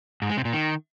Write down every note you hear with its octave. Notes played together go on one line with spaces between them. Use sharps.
G#2
G#3
C3
A#2
D#3